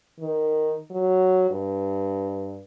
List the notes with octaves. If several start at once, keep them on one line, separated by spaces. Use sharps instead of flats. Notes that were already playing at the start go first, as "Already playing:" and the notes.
D#3
F#3
G2